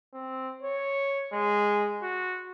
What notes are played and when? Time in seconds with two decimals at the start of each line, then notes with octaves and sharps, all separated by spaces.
0.14 C4
0.63 C#5
1.33 G#3
2.03 F#4